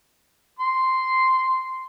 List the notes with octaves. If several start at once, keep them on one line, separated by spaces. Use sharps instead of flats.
C6